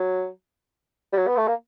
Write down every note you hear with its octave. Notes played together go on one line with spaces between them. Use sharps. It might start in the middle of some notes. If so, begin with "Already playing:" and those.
Already playing: F#3
G3
F#3
B3
A3
A#3